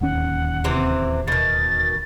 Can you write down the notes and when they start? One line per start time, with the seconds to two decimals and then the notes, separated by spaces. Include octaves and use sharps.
0.01 D1 D#2 C#4 F#5
0.64 C3 E3 C4
1.28 B2 D#3 A6